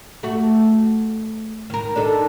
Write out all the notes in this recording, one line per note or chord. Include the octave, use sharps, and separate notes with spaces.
A3 F#4
D#3 A#4
D4 D#4 A4